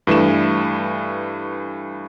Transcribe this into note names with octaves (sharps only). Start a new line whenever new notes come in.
G2 E3 A3 E7